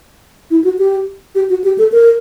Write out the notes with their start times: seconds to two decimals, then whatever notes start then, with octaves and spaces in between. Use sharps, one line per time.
0.51 E4
0.64 F#4
0.78 G4
1.35 G4
1.50 F#4
1.64 G4
1.78 A4
1.92 A#4